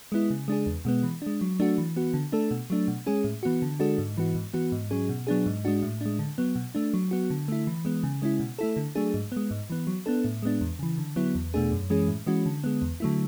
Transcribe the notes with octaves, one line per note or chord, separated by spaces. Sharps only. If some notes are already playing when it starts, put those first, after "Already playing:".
G#3 B3 E4
C#3
G#3 D4 G#4
E2
B2 G#3 B3
E3
G#3 D4
F#3
A3 D4 F#4
E3
B3 F#4
D3
A3 D4 A4
B2
F#3 A3 D4
B2
G#3 C#4 G#4
A2
E3 B3 F#4
D3
G#3 D4 F#4 A4
G#2
E3 B3 F#4
G#2
E3 B3 F#4
G#2
F#3 C#4 G#4
B2
F#3 B3 D4 G#4
G#2
G#3 D4 F#4
A2
G#3 D4
D3
F#3 B3
B2
A3 D4
F#3
B3 F#4
D3
A3 E4
E3
G#3 B3
C#3
G#3 C#4 E4
B2
A3 E4 A4
D3
F#3 A3 D4 G#4
G#2
G#3 B3
G#2
E3 B3
F#3
B3 D4 A4
A2
G#3 B3 D4
E2
C#3 E3
D3
F#3 B3 E4
E2
B2 A3 D4 G#4
F#2
E3 G#3 C#4 G#4
A2
E3 G#3 C#4 F#4
D3
G#3 B3
E2
D3 F#3 A3 E4